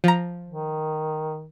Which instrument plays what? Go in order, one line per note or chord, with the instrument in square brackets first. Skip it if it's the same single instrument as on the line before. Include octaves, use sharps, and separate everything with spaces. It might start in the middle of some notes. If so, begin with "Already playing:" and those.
[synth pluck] F3 A#5
[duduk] D#3